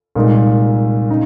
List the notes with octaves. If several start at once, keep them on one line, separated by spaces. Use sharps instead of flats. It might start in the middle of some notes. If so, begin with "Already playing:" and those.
C2 A#2 G#3 D#4
C#3 D#4